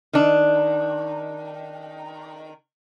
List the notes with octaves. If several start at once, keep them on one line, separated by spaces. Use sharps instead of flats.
D#3 D4